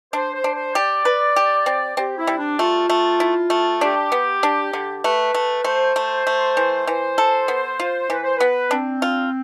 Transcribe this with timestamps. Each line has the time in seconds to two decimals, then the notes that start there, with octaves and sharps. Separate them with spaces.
0.13 D4 C5
0.34 C5
0.44 D4
0.54 C5
0.75 G4 D5
1.05 B4
1.36 G4
1.66 C4
1.97 C4 G4
2.18 E4
2.27 G3
2.38 D4
2.59 A3 F4
2.89 A3
3.20 E4
3.50 A3
3.81 D4 G4
4.12 B3
4.43 D4
4.73 D3
5.04 A3 B4
5.34 A3
5.64 A3 C5
5.96 A3
6.27 A3
6.57 E3
6.87 E3 C5
7.18 A4
7.48 B3
7.80 F4
8.10 E3 B4
8.23 C5
8.37 B3 B4
8.71 C4 D4
9.02 F4